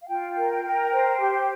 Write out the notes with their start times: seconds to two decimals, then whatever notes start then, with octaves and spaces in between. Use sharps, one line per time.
0.03 F5
0.08 F4 G5
0.36 A#4
0.64 A#4
0.92 C5
1.20 G4